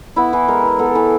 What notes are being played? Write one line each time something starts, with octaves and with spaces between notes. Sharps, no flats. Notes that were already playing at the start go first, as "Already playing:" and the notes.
B3 E4
E3
G#3 A#4
E3
B3 A4
E3